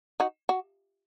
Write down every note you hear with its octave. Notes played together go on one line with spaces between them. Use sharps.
D#4 F#4
F#4